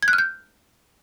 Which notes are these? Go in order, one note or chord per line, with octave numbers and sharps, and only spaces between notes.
G#6
F#6
F6
G6